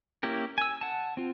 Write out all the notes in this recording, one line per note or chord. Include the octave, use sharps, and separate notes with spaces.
A#3 C#4 E4 G4 A#4
G#5 E6
F#5 A5
C4 F4